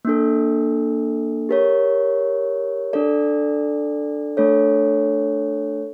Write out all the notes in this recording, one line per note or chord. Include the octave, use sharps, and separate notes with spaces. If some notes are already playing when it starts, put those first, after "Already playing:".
A#3 D4 A4
G4 A#4 C#5
D4 A4 D5
A3 D4 A4 C#5